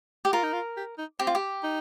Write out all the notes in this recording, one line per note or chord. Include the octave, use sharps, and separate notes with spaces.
G4
F4 A#4
D#4
F4
G4
D#4
C4 G4
F4
G4
D#4